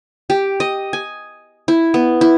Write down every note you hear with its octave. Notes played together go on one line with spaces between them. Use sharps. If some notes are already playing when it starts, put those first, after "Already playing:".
G4
D#5
G#5
E4
B3
E4